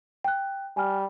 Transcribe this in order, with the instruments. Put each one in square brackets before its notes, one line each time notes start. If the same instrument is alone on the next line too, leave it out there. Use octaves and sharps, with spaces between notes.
[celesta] G5 F#6
[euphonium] G3 [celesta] G#5 F6